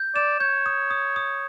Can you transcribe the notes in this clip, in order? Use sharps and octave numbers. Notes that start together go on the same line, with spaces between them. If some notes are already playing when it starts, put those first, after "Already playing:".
Already playing: G6
D5 E7
C#5 G6
D#6
D#6
D#6